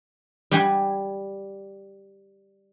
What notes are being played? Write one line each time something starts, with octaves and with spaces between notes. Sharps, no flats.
G3 G4 F#5 G#5